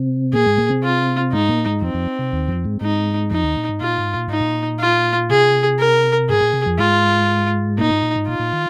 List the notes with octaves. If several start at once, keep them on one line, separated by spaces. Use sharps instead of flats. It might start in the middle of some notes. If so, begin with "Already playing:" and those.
Already playing: C3 C4
A#2 A#3 G#4
G#2 G#3
A#2 A#3
C3 C4
F4
G#2 G#3 D#4
A#2 A#3
G#2 G#3
F2 F3 C4
F2 F3
C3
D#2 D#3
F2 F3
G#2 G#3
G#2 G#3 D#4
F2 F3 D#4
D#2 D#3
A#2
G#2
A#2 F4
G#2
A#2
G#2 D#4
A#2
F4
C3 G#4
A#4
G#2 G#4
A#2
C3
F2 F3
G#2 G#3 F4
A#2 A#3 D#4
G#2
A#2
G#2
A#2 F4
A#2
D#3